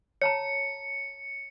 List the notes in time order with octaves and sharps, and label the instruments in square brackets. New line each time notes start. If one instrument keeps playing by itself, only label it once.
[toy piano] C#5 A5 A#5 [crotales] C#7